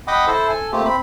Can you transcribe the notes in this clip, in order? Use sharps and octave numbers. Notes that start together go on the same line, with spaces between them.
D#5 F#5 G5 B5 D6 D#6
E4 A4 C5
A4 G#5
A3 A#3 C4 F4 G4
C4 B5